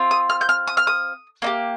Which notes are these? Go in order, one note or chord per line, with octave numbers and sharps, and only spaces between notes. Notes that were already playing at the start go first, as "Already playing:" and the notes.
Already playing: C4 F4
D#6
F6
G6
F6
D#6
F6
D#6
A#3 D#4 G4